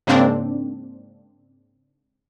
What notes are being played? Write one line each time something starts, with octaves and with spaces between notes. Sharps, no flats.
G#2 C#3 A#3 C4 D4